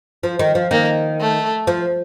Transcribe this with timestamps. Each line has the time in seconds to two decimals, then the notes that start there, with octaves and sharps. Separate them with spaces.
0.23 F3
0.39 D#3
0.55 F3
0.71 D#3 A#3
1.20 A3
1.67 F3